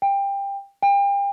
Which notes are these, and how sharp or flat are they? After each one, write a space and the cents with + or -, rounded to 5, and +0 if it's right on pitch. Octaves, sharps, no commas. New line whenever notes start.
G5 +20
G5 +35